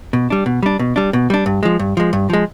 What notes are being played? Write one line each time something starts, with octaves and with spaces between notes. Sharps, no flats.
B2
G3 D4
B2
G3 D4
B2
G3 D4
B2
G3 D4
G2
F3 G#3
G2
F3 G#3
G2
F3 G#3